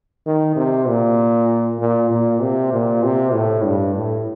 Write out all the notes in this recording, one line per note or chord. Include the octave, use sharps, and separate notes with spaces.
D#3
C3
A#2
A#2
A#2
C3
A#2
C3
A2
G2
A2